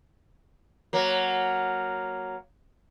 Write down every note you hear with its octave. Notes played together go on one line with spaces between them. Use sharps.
F#3 A#3